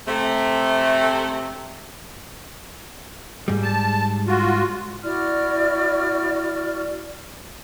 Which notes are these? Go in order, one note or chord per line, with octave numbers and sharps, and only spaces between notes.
C3 A3
G#2 G3
A5
F4 F#4
E4 F#4 D5 F6